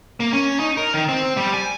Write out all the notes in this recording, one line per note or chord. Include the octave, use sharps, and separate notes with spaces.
A#3
C#4
D#4
A#4
D#3
C4
G3
G#5